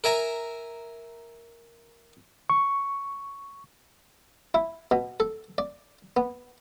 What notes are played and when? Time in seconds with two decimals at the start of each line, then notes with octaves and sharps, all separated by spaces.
0.04 A#4 E5 G#5 A#5
2.50 C#6
4.54 E4
4.91 B2
5.20 A4
5.58 D5
6.17 B3